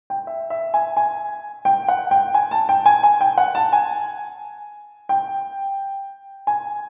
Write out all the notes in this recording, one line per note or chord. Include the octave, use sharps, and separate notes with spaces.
G5
E5
E5
G#5
G#5
G5
F#5
G5
G#5
A5
G5
G#5
G#5
G5
F#5
A5
G#5
G5
G#5